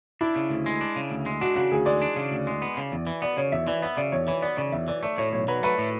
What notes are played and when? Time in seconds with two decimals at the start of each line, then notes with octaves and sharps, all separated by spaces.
0.21 D4 E4
0.36 C#3
0.50 D2
0.66 G#3
0.81 D4
0.96 C#3
1.11 D2
1.26 G#3
1.41 D4 F#4
1.56 C#3 F#4
1.72 D2 G#4
1.86 G#3 D5
2.02 D4
2.16 C#3
2.32 D2
2.47 G#3
2.62 B3
2.77 C#3
2.92 E2
3.07 E3
3.22 B3 D5
3.37 C#3 C#5
3.52 E2 E5
3.67 E3 D5
3.82 B3 E5
3.97 C#3 D5
4.12 E2 C#5
4.27 E3 C#5
4.42 B3 D5
4.57 C#3 D5
4.72 E2 E5
4.88 E3 D5
5.03 A3 D5
5.18 A2 C#5
5.33 B1 C#5
5.48 F#3 B4
5.63 A3 B4
5.78 A2